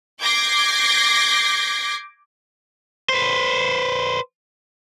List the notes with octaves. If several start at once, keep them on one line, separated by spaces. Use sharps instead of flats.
D6 G6 G#6 A#6 C7
B4 C5